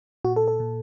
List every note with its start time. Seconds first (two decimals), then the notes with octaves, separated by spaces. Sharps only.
0.24 A#2 F#4
0.36 A4
0.48 A4
0.60 A#2